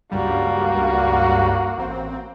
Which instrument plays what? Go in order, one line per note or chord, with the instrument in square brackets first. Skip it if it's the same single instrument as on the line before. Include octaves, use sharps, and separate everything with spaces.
[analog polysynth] C#2 G2 G3 [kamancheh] A#3 F#4
[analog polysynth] A1 C4